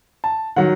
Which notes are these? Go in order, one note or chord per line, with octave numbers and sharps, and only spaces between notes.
A5
D#3 F#3 F#5